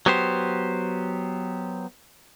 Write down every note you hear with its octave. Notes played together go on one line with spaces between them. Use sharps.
F#3 B3 G4 C5